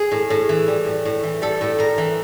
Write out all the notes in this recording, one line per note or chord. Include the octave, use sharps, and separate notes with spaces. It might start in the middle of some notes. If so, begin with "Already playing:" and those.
Already playing: G#4
A2
A2
E3
G3
A2
A2
E3
G3 A4
A2
A2 A#4
E3